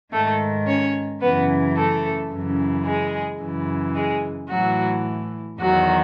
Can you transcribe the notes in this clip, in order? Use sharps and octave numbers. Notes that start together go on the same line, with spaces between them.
G#2 D#3 A3 A4
C#4 C#5
F#2 C#3 E3 B3 B4
A3 A4
F#2 C#3 E3
G#3 G#4
F#2 C#3 E3
G#3 G#4
A2 E3 F#3 F#4
E2 D#3 F#3 F#4